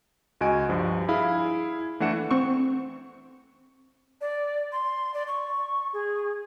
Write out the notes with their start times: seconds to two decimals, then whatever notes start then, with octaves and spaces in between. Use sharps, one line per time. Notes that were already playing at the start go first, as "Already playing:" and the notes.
0.41 C#2 F#4 D#5 G#5 D7
0.69 G2 F3
1.09 E4 G#4 F5 B5
2.00 E3 A3 D4 F#5 C#7 E7
2.31 C4 C#6
4.21 D5
4.72 C6
5.14 D5
5.28 C#6
5.93 G#4